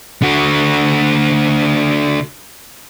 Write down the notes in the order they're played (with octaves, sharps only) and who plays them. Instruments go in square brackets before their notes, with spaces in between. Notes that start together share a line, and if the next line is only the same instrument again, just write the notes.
[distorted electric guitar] D3 F#4